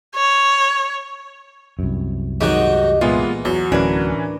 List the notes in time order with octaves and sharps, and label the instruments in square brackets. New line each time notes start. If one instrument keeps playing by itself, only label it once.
[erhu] C#5
[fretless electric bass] C2 F#2
[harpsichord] G#2 D#3 F#3 [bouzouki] G4 D#5 F#5
[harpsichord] A#2 [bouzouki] E3 [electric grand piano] G#3 B3 F4
[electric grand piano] E2 [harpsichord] F#3
[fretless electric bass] D1 [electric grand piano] E3 C#4 [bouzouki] D4 A#4 B4